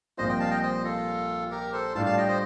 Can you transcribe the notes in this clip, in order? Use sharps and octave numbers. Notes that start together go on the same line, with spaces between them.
A#1 A#2 G3 C4 F4 C5 D#5
D#5 G5
F5 A5
D#5 G5
C5 D#5
F4 A4
G4 A#4
A4 C5
A2 G3 D4 F4 F5 A5
F5 A5
D#5 G5
C5 D#5